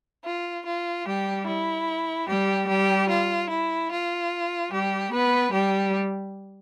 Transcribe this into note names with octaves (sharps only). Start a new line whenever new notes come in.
F4
F4
G3 G4
E4
G3 G4
G3 G4
F4
E4
F4
G3 G4
B3 B4
G3 G4